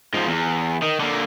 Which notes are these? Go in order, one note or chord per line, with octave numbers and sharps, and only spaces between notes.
G#2 F3
E2
D#3
D3 A#3